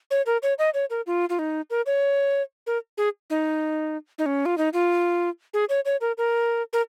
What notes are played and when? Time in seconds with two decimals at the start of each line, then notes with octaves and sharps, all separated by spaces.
0.11 C#5
0.26 A#4
0.43 C#5
0.59 D#5
0.74 C#5
0.90 A#4
1.07 F4
1.29 F4
1.39 D#4
1.70 A#4
1.86 C#5
2.67 A#4
2.98 G#4
3.30 D#4
4.18 D#4
4.26 C#4
4.46 F4
4.58 D#4
4.73 F4
5.54 G#4
5.69 C#5
5.85 C#5
6.01 A#4
6.18 A#4
6.73 A#4